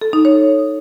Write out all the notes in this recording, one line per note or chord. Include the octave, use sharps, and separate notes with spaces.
A4
D#4
C#5